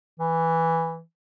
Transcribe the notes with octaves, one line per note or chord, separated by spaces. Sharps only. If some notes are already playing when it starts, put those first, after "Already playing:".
E3